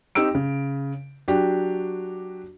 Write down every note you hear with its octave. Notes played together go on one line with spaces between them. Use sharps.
C4 D#4 G4 E6 D7
C#3
F#3 D4 F#4 G4